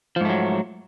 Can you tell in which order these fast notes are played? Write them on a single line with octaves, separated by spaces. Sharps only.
F3 G#2 A3 F#3